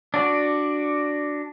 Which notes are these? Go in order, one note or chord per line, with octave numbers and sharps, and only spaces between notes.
D4 F#4 D5